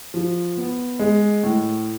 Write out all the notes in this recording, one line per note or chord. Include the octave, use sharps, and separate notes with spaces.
F3
B3
G#3
A2